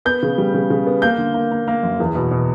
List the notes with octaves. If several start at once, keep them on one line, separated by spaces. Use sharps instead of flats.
B3 G6
C#3
G3
C#3
C#3
B3
A#3 G6
D3
A#3
A#3
A#3
F#2
E2
B2
B2